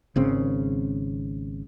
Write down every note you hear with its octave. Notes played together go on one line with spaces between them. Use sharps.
G#1 C#3 C4